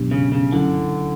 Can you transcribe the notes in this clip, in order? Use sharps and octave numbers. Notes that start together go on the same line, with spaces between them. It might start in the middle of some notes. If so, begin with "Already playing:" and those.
Already playing: B2 F#3 B3 D4 G4
C#3
C#3
D3 F#3 C#4 E4